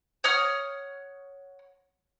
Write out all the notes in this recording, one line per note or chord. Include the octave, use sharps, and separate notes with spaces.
C#5 F#5 D#6 F6